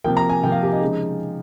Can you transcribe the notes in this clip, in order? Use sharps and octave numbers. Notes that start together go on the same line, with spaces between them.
C3 F3 A#3 G5
A#5
G#5
C3 F3 A#3 G5
F5
G4
D#4
C#3 F3 G#3